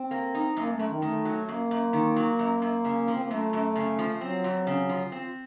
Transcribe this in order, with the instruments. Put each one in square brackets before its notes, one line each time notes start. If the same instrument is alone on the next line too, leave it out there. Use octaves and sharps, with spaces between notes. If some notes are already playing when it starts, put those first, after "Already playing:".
Already playing: [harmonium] C4
[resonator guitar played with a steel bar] A#3
D#4
[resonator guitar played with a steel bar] F#2 [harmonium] A#3
[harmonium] A3
[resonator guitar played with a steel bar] F#2
[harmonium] D#3
[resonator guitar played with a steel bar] D#3 [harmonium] A3
[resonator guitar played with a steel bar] F#3
[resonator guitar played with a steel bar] F#2 [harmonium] A#3
[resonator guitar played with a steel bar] F#2
D#3
F#3
F#2
F#2
C#3
F3
[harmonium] C4
A#3
[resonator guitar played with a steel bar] F#2 [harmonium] A3
[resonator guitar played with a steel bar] F#2
C#3
F3
[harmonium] F#3 [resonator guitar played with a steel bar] C4
[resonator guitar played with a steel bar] F2
C#3
F3
C4